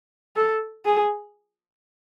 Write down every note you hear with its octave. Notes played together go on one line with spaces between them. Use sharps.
A4
G#4